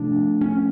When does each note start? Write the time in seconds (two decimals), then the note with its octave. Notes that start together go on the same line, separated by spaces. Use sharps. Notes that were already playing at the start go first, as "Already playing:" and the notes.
Already playing: C3 F3 A3 D4
0.41 C#4